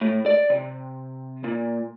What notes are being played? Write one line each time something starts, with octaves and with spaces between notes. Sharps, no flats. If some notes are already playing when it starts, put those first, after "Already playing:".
A2
D5
C3
A#2